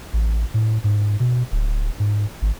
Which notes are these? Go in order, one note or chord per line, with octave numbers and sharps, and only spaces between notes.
A1
A2
G#2
B2
D1
G#2
G#1